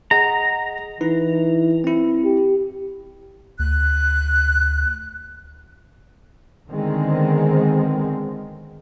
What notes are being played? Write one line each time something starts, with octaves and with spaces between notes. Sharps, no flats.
G#4 D#5 F#5 A#5
E3 D#4 E4 B4
C4 E4
G4
D2 F#6
D3 D#3 G#3 B3 C4